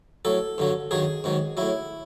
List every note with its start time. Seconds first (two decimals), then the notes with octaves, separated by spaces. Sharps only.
0.25 A2 F#3 A4
0.58 G2 D3 F#3
0.91 G2 D#3 F#3 G#4
1.24 G#2 D#3 F#3
1.57 A2 F#3 E4